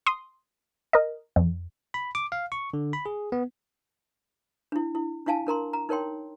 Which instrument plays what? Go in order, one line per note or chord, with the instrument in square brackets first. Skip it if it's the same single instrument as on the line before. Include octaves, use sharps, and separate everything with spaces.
[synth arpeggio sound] C6 D#6
A#4 D#5
F2
[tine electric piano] B5
D6
F5
C#6
D3
B5
G#4
B3
[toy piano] D4 E4
E4
D4 E4 F5 G#5 A5
D4 A#4 A#5 C6
A#5
D#4 A#4 C#5 G5 C6